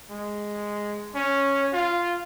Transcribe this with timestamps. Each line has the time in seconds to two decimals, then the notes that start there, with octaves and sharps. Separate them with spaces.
0.10 G#3
1.15 C#4
1.73 F4